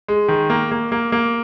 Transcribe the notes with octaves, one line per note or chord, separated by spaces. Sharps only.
G#3
D#3
A#3
A#3
A#3
A#3